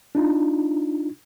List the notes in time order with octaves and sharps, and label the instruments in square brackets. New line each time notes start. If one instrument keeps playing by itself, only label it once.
[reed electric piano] D4 D#4 F4